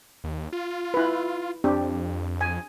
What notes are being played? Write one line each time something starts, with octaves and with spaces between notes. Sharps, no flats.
D#2
F4
E4 B4
F2 C4 D4 G4
G#5